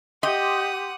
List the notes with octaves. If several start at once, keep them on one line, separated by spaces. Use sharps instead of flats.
G4 D#5 F#5 C6 D6 D#6 G6